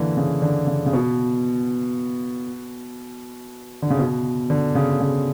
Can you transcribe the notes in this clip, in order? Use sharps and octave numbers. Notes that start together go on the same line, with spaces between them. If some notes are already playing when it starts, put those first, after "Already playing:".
Already playing: D3 E3 A#3
C#3
D3
C#3
C#3
B2
D3
C#3
B2
D3
C#3
C#3